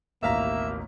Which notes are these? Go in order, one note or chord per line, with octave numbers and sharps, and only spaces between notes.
A1 D#2 B2 A#3 E5 F5 A#5 B6